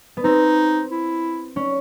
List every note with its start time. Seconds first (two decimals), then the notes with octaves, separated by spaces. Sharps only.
0.17 B3
0.24 C4 D#4
0.91 E4
1.56 C#4